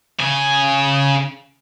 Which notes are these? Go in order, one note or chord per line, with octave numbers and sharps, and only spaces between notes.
C#3 G#5